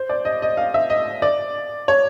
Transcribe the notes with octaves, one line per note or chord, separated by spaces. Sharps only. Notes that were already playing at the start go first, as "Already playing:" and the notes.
Already playing: C5
D5
D#5
D#5
F5
E5
D#5
D5
C#5